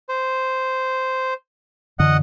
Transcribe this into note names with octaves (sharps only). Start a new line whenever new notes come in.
C5
F#2 D3 E3 D#5 F#5